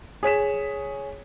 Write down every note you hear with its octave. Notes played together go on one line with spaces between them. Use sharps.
G#4 C#5 B6 E7